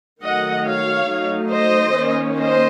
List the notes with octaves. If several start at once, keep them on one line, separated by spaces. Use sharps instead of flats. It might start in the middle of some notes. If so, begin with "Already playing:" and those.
D#3 F#3 A3 D#5 F#5
C#5 F5
F#3 A3 D#4
C5 D#5
D#3 A#3 C#4
C5 D#5